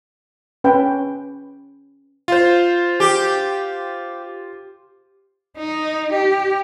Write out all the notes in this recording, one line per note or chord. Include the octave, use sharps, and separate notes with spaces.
C#4 B4 G5
F4 C5
G4
D#4
G4